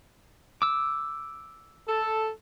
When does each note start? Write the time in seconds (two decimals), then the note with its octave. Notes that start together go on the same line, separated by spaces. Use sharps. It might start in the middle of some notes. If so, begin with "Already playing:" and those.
0.62 D6 E6
1.87 A4